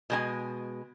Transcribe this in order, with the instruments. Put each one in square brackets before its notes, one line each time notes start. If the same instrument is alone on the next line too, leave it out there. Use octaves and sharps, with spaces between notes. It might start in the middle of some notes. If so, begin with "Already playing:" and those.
[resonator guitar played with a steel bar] B2 G#3 G#5